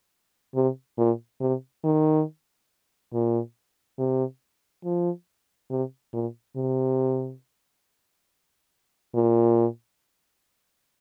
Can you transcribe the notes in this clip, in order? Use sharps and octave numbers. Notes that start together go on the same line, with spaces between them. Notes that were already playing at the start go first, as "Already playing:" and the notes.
C3
A#2
C3
D#3
A#2
C3
F3
C3
A#2
C3
A#2